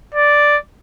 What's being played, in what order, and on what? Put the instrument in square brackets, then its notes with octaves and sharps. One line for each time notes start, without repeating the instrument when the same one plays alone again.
[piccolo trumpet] D5